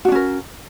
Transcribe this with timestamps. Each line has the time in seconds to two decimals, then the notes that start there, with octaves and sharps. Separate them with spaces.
0.05 F#4
0.08 D4
0.12 C#4
0.15 A#4